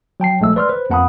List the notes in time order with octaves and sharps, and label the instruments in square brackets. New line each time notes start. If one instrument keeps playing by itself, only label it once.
[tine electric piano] F#3 G5 A5 C7
A#1 G#3 A3 E6
B4 D5 C6 E6 F6
B4 C5
F2 A#3 F#5 A5 B5 D#6